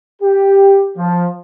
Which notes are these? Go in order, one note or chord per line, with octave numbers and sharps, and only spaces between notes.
G4
F3